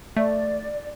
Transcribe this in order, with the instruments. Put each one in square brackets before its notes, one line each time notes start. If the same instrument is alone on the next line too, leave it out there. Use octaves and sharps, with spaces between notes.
[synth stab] A3 [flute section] D5